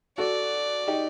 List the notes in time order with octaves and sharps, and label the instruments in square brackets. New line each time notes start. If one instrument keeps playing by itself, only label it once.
[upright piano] F#4 A4 [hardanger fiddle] D5
[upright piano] D#4 G4